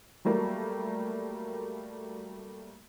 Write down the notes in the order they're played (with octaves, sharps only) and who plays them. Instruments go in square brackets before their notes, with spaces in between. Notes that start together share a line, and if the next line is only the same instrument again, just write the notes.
[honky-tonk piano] F#3 G3 A3 A#3